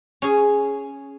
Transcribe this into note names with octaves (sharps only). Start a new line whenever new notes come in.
C#4 G#4